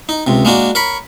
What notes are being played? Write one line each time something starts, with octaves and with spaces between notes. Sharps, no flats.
D#4
C#2 C3
G#3 A#3 D4 F#4
A#4 C#5 B5